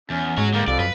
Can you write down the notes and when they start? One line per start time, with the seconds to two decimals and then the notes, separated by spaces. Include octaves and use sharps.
0.10 E2 C#4
0.38 G#2 G#3 F#4 C#5
0.54 D3 G3 A#3
0.68 C2 F2 D5 F5
0.80 F#2 B4